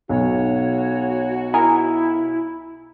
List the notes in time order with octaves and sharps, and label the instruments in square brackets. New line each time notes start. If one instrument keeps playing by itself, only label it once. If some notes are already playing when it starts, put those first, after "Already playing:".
[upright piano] B1 [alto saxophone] F#4 [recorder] C#5
[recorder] E4 [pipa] G#4 A#4 G#5